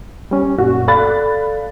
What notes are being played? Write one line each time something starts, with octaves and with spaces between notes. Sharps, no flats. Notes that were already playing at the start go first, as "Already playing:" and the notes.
G3 C#4
F#2 A#2 F#4
A4 D5 F5 B5 F#6 A6